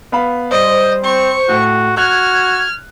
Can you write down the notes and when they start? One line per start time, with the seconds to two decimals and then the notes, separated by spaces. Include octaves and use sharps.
0.12 B3 F5 B5
0.51 G3 C5 D#5
1.04 C4 C#6
1.49 A2 F#4
1.97 F#4 F6 F#6 G#6